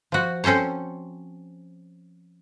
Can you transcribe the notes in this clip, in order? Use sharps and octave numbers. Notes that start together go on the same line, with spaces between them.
F3 F#4
C4 C#4 A4 C5 C#5